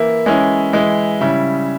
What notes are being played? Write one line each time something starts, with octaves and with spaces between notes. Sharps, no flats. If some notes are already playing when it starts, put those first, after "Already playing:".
Already playing: E3 A#3 E4
E3 G#3 C#4 E4
E3 G#3 E4
C#3 G3 C#4 E4